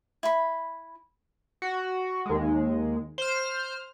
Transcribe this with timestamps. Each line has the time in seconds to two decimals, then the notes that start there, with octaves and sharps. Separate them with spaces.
0.23 E4 B5
1.62 F#4
2.26 D#2 G#3
3.18 C5 F6